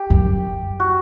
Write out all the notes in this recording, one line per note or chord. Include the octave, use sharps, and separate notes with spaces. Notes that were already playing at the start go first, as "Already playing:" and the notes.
Already playing: G4
F#2
F#4